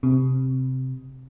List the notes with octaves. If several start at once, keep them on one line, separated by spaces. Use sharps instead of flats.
C3